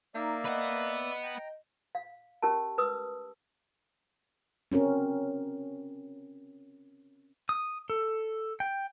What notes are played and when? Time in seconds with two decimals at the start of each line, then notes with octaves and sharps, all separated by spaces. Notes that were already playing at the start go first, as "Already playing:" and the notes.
0.15 A#3 D#4 D5 E5 A#5
0.45 B4 D#5 F#5
1.23 G5 A#5
1.95 F5
2.42 C#4 G4 A#4 A5
2.78 B4 D#6 E6
4.72 C4 C#4 F#4 A#4
7.49 D#6
7.90 A4
8.60 G5